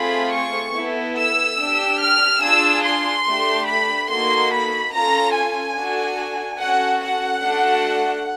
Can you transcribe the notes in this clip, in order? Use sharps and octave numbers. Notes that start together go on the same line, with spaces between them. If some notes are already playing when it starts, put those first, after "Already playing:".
Already playing: A3 C4 F4 G#4 B5
C#6
B3 E4 A4
E6
D4 G4
F6
D4 F4 G#4 E6
C6
A3 D4 G4
B5
A#3 D#4 F#4 A4 C6
B5
C#4 F4 A4 A#5
G#5
D4 F#4 A4
C#4 F#4 A4 F#5
F#5
A3 D4 F#4 A4